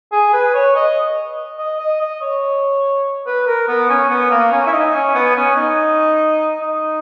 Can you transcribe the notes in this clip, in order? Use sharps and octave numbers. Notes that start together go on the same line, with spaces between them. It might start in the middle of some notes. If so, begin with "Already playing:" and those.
G#4
B4
C#5
D#5
D#5
D#5
D#5
C#5
B4
A#4
B3
C#4
B3
A#3
C#4
E4
D#4
C#4
B3
C#4
D#4
D#4